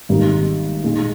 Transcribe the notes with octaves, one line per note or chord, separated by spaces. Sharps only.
G#1 G#2 G3 A#3 D#4
A#2 G#3 D#4 G#4